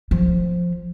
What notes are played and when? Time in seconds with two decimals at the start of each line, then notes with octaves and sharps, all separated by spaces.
0.11 F3